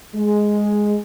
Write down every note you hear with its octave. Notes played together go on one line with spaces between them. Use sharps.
G#3